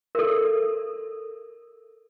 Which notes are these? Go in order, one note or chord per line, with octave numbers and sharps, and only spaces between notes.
A4 A#4